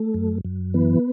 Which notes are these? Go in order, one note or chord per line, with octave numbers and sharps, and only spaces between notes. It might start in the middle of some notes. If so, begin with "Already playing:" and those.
Already playing: A3
F#2
F#2
E3 B3